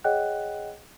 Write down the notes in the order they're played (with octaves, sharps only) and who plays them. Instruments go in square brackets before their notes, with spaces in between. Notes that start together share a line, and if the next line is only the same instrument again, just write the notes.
[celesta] G#4 C#5 D#5 F#5 G5 F#6